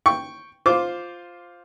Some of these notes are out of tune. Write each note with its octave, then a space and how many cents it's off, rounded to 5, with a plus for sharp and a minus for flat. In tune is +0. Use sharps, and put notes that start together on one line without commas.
G5 +0 C#6 +0
F4 +5 C5 +0 D6 -5